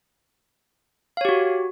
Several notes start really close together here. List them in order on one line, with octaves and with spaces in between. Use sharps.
F5 C#5 G4 F#4